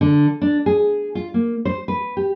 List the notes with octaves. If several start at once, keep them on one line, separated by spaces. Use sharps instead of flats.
D3
D4
G#4
F4
A#3
C5
B4
G4